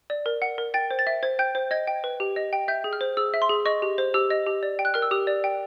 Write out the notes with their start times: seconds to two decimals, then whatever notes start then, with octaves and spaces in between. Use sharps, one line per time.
0.10 D5
0.26 A#4
0.42 F#5
0.58 A#4
0.74 G5 A6
0.91 C5
0.99 A6
1.07 E5
1.23 C5 G#6
1.39 G5 G6
1.55 C5
1.71 D#5 G#6
1.87 G5
2.04 B4
2.20 G4
2.36 D#5
2.53 G5
2.68 E5 G6
2.84 G#4
2.93 F6
3.01 C5
3.17 G#4 E6
3.34 E5
3.42 C6
3.49 G#4
3.66 D#5 C#6
3.82 G4
3.98 C5
4.14 G4 E6
4.30 D#5
4.47 G4
4.63 D5
4.79 G5
4.85 F#6
4.94 A#4 F6
5.02 E6
5.11 G4 D#6
5.27 D5
5.44 G5